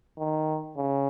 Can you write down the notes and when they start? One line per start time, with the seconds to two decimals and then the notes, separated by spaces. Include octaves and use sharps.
0.18 D#3
0.77 C#3